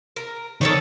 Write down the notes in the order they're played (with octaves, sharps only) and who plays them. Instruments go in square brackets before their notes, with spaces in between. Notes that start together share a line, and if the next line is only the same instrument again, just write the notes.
[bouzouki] A#4
[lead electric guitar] D#3 [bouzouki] A4 C#5 D5